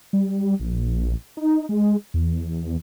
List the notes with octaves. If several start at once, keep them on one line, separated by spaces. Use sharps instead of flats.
G3
A#1
D#4
G#3
E2